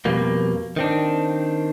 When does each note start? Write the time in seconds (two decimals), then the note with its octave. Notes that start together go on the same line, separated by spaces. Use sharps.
0.05 F2 B2 G3 A#3
0.76 D#3 C4 D4